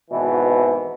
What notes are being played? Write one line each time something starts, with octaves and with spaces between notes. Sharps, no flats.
G#1 B2 E3